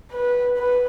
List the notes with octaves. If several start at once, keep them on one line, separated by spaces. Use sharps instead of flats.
B4
B4